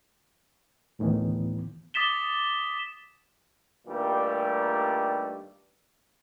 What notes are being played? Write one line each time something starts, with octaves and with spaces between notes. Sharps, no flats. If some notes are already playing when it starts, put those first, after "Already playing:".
D2 A2 D#3 E3 B3
D6 D#6 A6 B6 E7 G7
G2 A#2 D#3 G3 A3